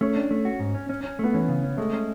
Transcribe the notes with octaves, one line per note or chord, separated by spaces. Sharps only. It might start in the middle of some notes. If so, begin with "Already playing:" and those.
A3 C#4
D4
A3
F#4
G#2
C#4
C#4
C#4
A3 B3
E3 C#4
C#3
C#4
G#3 A3
C#4